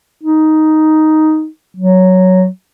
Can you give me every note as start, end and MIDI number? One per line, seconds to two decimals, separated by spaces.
0.23 1.46 63
1.77 2.47 54